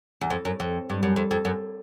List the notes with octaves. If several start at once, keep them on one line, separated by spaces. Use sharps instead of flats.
E2
F2
F#2
F2
G2
F#2
F2
F2
F#2